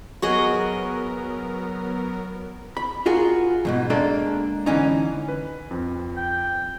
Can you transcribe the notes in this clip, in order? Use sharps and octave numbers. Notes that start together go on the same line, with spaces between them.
F#3 B3 F#4 G#4 A#4 D#5
B5
F4 F#4 G#4 A#4
E2 G#2 B2
G#3 A#3 D4 A4 A#5
D3 E3 C#4 D#4
B4
F2 C4
G5